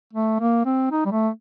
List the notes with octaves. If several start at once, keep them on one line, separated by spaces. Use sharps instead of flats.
A3
A#3
C4
D#4
G3
A3